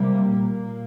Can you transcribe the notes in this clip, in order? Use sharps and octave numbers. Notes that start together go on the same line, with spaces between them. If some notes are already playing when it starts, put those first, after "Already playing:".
Already playing: C3 G3 A#3
A#2 A#3